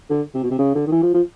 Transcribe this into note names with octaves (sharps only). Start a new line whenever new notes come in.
D3
C3
B2
C3
C#3
D3
D#3
E3
F3
F3